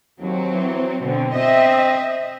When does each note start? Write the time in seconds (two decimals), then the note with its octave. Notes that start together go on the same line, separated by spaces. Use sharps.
0.20 D#2 F#3 C4
0.52 E3
1.02 B2 D3 C4
1.34 C4 D#5 E5